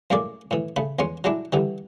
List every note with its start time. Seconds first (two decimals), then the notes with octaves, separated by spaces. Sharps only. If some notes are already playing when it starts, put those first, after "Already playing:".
0.10 F#2 A2 G#3 A#3 D5
0.51 A2 E3
0.76 C#3 A3 B5
0.99 E2 G#3 C#4 C6
1.24 F#3 G#3 D4 E4
1.53 D3 E3 G3